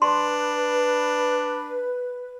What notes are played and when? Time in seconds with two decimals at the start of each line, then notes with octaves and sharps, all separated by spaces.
0.02 D4 B4 C6